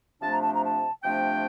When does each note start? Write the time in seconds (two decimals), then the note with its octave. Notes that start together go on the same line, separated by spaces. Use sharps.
0.20 C3 F3 A3 D4 A5
0.32 A#5
0.42 A5
0.53 A#5
0.64 A5
1.02 C3 F3 A3 D4 G5